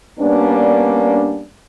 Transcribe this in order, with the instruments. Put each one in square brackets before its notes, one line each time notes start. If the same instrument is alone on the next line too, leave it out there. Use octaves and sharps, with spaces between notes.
[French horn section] G3 A#3 B3 C#4 D4